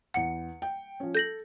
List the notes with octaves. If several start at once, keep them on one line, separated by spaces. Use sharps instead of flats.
E2 F#5 C#7
G5
F3 C#4
A4 G6 A#6 F#7